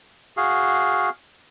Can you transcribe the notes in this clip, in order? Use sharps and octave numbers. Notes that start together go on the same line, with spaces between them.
F#4 G#4 F5